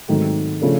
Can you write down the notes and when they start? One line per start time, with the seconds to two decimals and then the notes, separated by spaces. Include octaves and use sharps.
0.08 G#2 D#3 F#3 A3 C4
0.61 C#3 F3 A3 D4